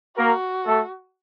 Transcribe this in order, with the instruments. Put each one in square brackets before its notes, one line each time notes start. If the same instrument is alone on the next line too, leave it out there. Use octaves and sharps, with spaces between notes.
[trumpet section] A#3 A#4 [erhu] F#4
[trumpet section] A3 A4